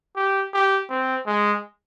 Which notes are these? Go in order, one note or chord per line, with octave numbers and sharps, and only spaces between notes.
G4
G4
C4
G#3